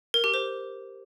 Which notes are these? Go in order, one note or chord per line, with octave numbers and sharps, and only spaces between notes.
A#4
G4
C5